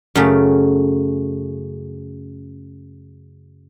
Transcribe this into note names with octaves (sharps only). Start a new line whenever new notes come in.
F#2 C#3 A3